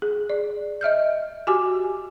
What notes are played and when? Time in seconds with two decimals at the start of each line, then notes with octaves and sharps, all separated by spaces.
0.02 G#4
0.30 D5
0.81 D#5 E5 F6 G6
1.47 F#4 G4 G#5 D6